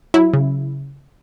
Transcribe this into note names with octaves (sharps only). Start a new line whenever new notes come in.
F#3 E4
C#3